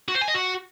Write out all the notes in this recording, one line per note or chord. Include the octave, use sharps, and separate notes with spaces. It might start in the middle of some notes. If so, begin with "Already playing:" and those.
F#4
C5
G#5
D#5
F#4